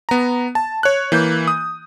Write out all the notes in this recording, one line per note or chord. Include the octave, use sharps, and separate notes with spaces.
B3 A#5
A5
C#5 F#6
E3 A#3 G6
D#6